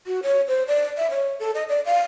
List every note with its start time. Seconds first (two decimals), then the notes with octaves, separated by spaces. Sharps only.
0.07 F#4
0.23 C#5
0.48 C5
0.67 D5
0.97 E5
1.11 C#5
1.40 A4
1.55 D#5
1.69 D5
1.86 F5